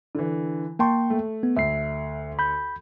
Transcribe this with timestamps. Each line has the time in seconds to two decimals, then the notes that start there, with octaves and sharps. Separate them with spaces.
0.15 D3 E3
0.79 A#3 G5 A5 C6 C#6
1.10 A3
1.43 B3
1.57 D2 E5 C7
2.39 B5 G6